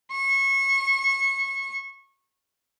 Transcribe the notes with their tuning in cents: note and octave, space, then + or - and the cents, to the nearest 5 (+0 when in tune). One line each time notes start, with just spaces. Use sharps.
C#6 -25